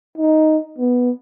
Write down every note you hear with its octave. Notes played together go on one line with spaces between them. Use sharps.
D#4
B3